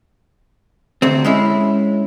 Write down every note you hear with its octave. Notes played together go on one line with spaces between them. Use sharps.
D2 C3 C4
G#3 C#4 E4